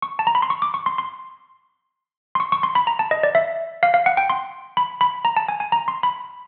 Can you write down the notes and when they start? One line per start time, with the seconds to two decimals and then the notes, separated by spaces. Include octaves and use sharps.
0.02 C#6
0.19 A5
0.27 A#5
0.35 B5
0.42 C6
0.50 C#6
0.62 D6
0.74 C#6
0.86 C6
0.98 C6
2.35 C6
2.40 C#6
2.52 C#6
2.63 C6
2.75 B5
2.87 A#5
2.99 A5
3.11 D#5
3.23 D5
3.35 E5
3.83 F5
3.94 F5
4.06 F#5
4.17 G5
4.30 C6
4.77 B5
5.01 B5
5.25 A#5
5.37 A5
5.48 G#5
5.60 G#5
5.72 A#5
5.88 C6
6.03 B5